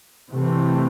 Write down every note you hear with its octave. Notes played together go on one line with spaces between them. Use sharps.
C3 E3 A3 C4